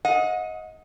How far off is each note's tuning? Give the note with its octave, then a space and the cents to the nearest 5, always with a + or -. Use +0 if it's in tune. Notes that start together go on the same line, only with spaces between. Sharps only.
D#5 +20 F#5 -35